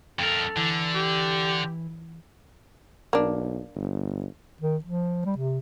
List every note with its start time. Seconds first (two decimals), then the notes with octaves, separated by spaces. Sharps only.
0.19 F2 A4 A#4
0.57 D3 E3
0.94 G4
3.13 B1 A#3 D4
3.75 G1
4.61 D#3
4.84 F3
5.25 G3
5.37 C3